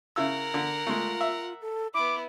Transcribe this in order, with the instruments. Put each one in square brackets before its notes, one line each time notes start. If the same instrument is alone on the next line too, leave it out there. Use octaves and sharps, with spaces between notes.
[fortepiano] C#3 E4 E6 [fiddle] A#4 F#5
[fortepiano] D3
[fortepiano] G#3 A3 [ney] F4
[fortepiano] E5
[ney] A4
[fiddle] B3 E4 [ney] B5 [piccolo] D6